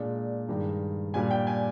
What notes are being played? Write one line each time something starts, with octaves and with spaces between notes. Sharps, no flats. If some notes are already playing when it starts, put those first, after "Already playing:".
Already playing: A#2 G#3 D4
G2 D#3 G#3
A#2 G3 D4 G#5
G5
G#5